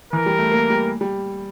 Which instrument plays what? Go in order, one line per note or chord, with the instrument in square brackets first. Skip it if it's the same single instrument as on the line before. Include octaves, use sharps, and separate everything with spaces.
[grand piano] E3 [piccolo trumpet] A#4
[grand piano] G3
A3
A#3
G3
G3